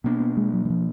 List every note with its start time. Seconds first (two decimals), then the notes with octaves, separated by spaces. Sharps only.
0.04 B2 A#3 B3 D4
0.20 B3
0.37 G#3
0.54 F#3
0.65 F#3
0.70 F3